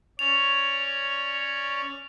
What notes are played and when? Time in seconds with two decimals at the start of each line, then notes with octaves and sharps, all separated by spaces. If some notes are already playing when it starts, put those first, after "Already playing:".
0.19 C#4 C#5 D5 F7